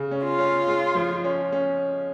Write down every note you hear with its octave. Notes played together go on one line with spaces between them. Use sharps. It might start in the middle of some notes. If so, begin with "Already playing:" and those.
Already playing: C#3
C#4
F4
C#4
G#3
F3
C#4
C#4